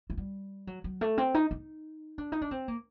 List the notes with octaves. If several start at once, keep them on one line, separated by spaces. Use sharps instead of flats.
A3
G3
F#3
F#3
A3
C4
D#4
D#4
D4
D#4
D4
C4
A#3